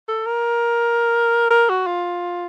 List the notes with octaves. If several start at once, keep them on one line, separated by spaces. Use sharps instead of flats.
A4
A#4
A#4
F#4
F4